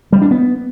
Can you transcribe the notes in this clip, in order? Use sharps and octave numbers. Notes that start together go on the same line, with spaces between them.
G3
D4
B3